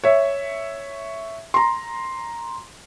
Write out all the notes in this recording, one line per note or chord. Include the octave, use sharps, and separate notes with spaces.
C#5 E5
A#5 C6